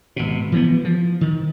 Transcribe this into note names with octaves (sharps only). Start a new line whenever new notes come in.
G#1 B2
E3 F3 B3
F3
D#3